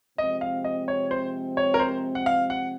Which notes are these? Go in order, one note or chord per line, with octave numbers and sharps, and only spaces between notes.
C3 F3 G#3 C4 D#5
F5
D#5
C#5
C5
C#5
A#4
C5
F#5
F5
F#5